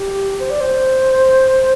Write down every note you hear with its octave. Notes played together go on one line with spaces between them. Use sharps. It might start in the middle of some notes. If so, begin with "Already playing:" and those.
Already playing: G4
C5
D5
C5